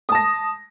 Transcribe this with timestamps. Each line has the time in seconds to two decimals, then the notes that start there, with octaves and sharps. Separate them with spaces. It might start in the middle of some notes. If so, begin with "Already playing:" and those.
0.09 D#6
0.12 A5
0.15 A#6